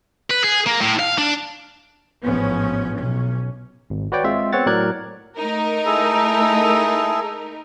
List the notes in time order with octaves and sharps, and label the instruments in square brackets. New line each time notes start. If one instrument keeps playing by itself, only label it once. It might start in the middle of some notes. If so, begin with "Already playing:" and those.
[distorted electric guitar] B4
G#4
A#3
A2
F5
D4
[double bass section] A1 G#2 F3 B3 C#4
B1 C#4
[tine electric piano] G#1
F#4 B4 C#5 D5 G5
G#3 C4 F4 E5
B3 C4 C#5 F#5 A6
A2 F#3 A#4 D5 F#6 G#6
[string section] A3 D#4 A#4
[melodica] E4 G#4 A4